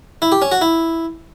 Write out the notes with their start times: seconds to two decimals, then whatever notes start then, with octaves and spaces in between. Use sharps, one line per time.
0.22 E4
0.32 G4
0.42 C#4
0.52 F#4
0.61 E4